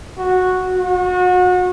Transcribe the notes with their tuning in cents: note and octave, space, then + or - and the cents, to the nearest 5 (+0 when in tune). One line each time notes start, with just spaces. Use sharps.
F#4 -10
F#4 -35